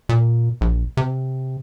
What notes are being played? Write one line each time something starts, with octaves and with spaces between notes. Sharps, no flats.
A#2
A#1
C3